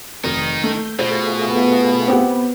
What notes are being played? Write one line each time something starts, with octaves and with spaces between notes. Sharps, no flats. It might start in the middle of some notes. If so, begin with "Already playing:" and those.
F1 D#3 D#4
A3 G6
B2 A3 F4 G#4 C5
B3
C4 G4 F#5